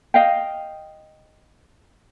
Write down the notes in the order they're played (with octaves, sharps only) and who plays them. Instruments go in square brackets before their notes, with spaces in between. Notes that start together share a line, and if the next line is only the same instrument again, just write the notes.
[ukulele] D#5 F5 G5